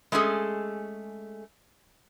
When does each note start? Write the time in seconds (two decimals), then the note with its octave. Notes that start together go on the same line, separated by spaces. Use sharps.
0.12 G#3 A3 C#4 G#4 A4